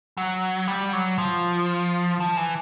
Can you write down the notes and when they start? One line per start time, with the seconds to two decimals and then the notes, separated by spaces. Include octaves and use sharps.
0.17 F#3
0.68 G3
0.93 F#3
1.18 F3
2.20 F3
2.37 E3